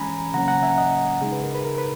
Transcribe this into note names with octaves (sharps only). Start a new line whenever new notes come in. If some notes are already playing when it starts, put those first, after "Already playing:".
Already playing: E3 G#3 C#4 G#5 A#5 B5
C#3 F#3 A#3 C#4 F#5 A#5
F#5 A#5
E5 G#5
D#5 F#5
C#3 G#3 D#4 G#4
B4
A#4
B4
A#4
B4